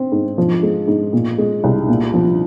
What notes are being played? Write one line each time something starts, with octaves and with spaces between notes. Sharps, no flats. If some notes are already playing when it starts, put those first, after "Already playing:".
Already playing: C4
G#2
F3
G#3
G#2
A#2
G#3
C2
A#2
F3